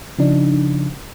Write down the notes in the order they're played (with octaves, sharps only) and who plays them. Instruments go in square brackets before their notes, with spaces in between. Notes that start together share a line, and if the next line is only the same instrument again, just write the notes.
[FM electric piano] C#3 F3 D4 D#4